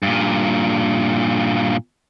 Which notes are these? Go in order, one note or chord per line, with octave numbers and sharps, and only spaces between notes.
G2 A#2